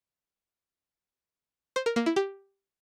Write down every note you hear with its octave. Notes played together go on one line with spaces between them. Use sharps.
C5
A#4
A#3
E4
G4